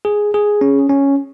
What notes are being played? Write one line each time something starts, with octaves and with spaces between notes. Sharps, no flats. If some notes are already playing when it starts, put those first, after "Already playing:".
G#4
G#4
C#4
C#4